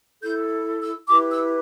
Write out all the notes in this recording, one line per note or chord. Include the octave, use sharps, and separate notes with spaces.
E4 A4 G6
E6
E4 G4 B4 D6
E6